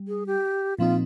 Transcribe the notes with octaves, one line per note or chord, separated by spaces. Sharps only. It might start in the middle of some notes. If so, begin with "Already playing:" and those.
Already playing: G3
G#4
G4
A#2 F3 C4 D#4 F4